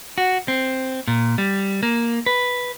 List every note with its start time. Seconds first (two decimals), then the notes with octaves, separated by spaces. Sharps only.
0.18 F#4
0.48 C4
1.08 A#2
1.38 G3
1.83 A#3
2.26 B4